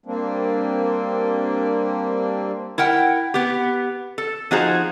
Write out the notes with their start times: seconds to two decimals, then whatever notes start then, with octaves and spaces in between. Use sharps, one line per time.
0.06 G3 A#3 C4 D4
2.78 E4 A#4 F#5 G5
3.34 B3 G4
4.18 A4
4.51 F3 D#4 F#4 G#4 C5 A#5